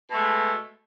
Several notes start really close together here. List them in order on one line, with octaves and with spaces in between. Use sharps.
B2 A3 G#3